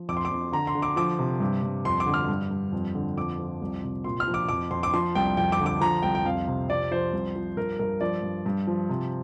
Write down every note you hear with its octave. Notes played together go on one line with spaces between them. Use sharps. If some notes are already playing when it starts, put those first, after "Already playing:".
Already playing: F3
F2 D6
C6
D6
F2
D3 A#5
C6
D3
D6
F3 D6
C3
G2
G2
F2 C6
D6
D3
F6
G2
G2
F2
D3
F2 D6
F3
C2
C3
A#2 C6
F6
F3
D6
F2 D6
F2 C6
D6
F3 C6
C2 G5
F2 G5
D6
D3
D6
F3 A#5
C2 G5
G5
F2 F5
C3
F2 D5
F3 C5
C2
F3
G2 A#4
G2 A#4
F3 D5
G2
G2
F3
C3